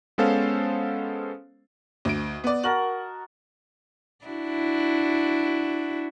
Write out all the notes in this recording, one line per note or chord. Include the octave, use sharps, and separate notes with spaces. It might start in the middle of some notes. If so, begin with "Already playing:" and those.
G#3 B3 C#4 A4 C5 F5
D2 D#5 D7
B3 D5
F#4 A#4 A5 F#7
D4 E4 F#4